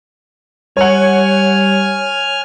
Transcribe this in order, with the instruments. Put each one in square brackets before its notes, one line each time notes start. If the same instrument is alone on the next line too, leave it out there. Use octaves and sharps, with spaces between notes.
[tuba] G3 [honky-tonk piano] C#5 F#5 [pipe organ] G#5 F6